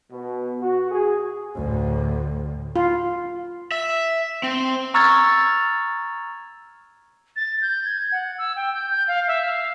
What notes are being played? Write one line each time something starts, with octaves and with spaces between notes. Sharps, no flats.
B2
F#4
G#4
D2 A2
F4
E5
C4
A#5 C#6 E6 F6 G#6 A6
A6
G6
G#6
F#5
E6
G5
G6
G6
F5
E5
F5